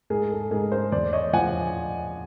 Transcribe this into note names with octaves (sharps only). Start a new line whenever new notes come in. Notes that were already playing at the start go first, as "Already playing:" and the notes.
G#2 G#4 A#4
A4
G#2 G#4 A#4
A#4 C5
E2 C5 D5
C#5 D#5
F3 F#5 G#5